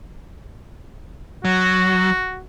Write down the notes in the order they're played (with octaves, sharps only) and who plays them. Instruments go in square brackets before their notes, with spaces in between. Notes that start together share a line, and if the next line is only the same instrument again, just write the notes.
[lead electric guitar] F#3 [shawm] F#4